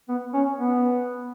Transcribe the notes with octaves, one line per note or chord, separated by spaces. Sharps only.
B3
C#4
B3